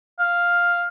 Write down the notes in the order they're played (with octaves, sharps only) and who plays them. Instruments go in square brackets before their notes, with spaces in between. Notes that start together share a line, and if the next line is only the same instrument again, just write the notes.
[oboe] F5